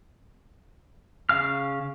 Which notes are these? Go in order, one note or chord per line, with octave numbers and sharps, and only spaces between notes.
C#3 F5 F6